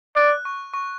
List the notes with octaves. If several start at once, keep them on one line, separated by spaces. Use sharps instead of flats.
D5 F#6
C#6
C#6